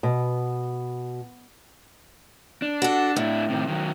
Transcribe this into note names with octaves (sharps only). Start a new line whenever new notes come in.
B2
D4
F#4 A4
A2 D4 E4
C3 D#3
D#3 F#3